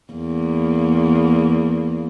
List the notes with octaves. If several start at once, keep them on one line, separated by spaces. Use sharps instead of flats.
E2 A#3